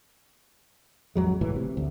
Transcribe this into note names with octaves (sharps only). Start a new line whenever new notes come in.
A1 F2 F#3 G#3
G1 C#2 A2 E3
C3
D2